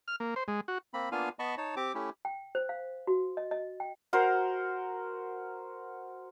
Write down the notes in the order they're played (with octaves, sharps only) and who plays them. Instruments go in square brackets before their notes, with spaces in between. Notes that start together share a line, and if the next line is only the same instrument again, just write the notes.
[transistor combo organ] F6
A#3
C5
G#3
F#4
[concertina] A#3 C4 B5
A#3 B3 D4 F4 F5 G#5
B3 D#5 A5 B5 C#6
D#4 C#5 A5
C4 G4 D6
A3 C#4 E4 G4
[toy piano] G5
C5
F5
F#4
D#5
D#5
G5
[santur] F#4 A#4 C5 C6